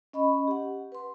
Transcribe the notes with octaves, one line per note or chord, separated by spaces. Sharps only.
C#4 D#5 B5 C#6
G4 F#5
B4 C6